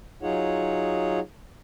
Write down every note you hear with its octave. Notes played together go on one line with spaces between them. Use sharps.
F#3 D#4 F4 G#4 C#5 F#5